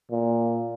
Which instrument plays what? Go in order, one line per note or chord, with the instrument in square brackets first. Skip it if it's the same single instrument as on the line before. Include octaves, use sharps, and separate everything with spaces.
[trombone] A#2